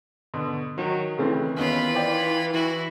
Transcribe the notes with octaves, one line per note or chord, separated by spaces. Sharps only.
B2 D3 B3
D#3 F#3
C#3 E3 A3 C4
D#2 B3 C#4 F4 B5
C5 D5 G5
E3 E4 F#4